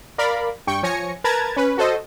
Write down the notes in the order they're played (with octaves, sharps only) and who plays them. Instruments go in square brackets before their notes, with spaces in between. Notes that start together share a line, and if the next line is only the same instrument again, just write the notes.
[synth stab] A#4 D5 F5 B5
G2 G5 C#6
F3 C#5 G#5 A#6 C#7
A#4 B4 A5 A#5 G#6 A6
C#4 B4
F#4 A4 C5 D#5